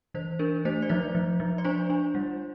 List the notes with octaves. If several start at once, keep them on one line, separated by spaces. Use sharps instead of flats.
E3 C5
D4 A#4
A3 C5
D5
F3 C5
F3
F3
D5
D4 C5
D4
G3